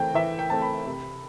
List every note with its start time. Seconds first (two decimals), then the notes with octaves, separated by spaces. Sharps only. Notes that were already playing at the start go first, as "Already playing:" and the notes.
Already playing: E3 A3 C4 G5
0.14 E3 E5
0.39 G5
0.50 A3 C4 A5
0.62 B5
0.86 C3